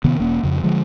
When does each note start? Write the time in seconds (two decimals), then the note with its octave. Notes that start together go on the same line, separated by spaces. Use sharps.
0.04 C3 D#3 B3
0.20 E1 A#3 C#4
0.43 F2 C#3
0.63 D3 F3 G#3